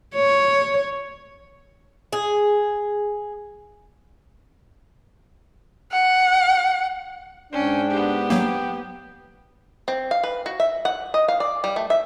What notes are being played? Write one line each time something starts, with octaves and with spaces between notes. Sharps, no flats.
C#5
G#4
F#5
G#2 C#4 D4 G5
B3 G4
F#3 A#3 G5
C4
F5
B4
F#4
E5
F#5
D#5
F5
D5
G3
A3
E5